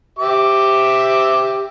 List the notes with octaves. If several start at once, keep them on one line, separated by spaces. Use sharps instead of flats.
G4 E5 D6